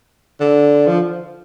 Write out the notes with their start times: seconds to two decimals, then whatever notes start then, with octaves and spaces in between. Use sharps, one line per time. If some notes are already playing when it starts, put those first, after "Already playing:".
0.40 D3
0.87 F3